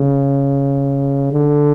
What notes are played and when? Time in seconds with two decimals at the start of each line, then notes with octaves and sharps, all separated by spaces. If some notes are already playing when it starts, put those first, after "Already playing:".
Already playing: C#3
1.32 D3